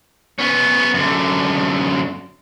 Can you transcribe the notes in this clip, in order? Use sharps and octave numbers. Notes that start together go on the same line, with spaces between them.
B3 C#4
F#2 D3